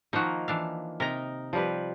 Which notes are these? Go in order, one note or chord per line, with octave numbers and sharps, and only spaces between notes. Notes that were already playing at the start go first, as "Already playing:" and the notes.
D#3 F3 A#3 D#4 F#4
E3 D4 F5
C3 D#4 A#4 D#5 A#5
F3 G3 B4